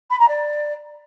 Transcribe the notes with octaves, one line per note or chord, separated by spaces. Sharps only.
B5
A#5
D5